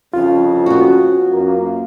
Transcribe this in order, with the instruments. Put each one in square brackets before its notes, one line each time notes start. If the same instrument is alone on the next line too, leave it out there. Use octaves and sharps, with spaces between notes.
[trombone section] C2 F2 C#3 [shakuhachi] C#4 [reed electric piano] F4
[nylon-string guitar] B3 F#4
[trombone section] F#2 A#3